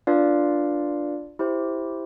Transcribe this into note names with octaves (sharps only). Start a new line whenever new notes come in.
D4 F4 B4 D5 F5
E4 G4 C5